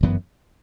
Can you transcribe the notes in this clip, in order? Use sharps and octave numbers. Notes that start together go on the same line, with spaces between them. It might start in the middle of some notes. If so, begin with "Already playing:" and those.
G1 F#2 E3 B3